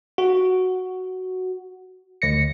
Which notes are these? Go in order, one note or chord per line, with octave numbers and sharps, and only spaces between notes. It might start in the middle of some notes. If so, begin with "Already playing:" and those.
F#4
D2 A#6 C#7